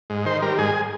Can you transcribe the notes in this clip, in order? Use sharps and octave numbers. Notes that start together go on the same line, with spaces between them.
G#2
D#3 C5
G3 A#4
G#2 G#4